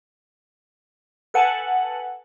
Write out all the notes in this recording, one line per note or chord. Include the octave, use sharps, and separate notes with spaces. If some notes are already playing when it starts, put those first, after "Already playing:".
A4 B4 F#5 G#5 A5